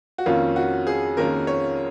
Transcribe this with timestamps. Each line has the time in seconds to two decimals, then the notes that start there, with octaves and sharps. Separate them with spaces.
0.18 F#4
0.26 F2 D#3 A#3 C#4 F4
0.56 F#4
0.87 G#4
1.17 F2 D#3 A#3 C#4 F4 A#4
1.47 C#5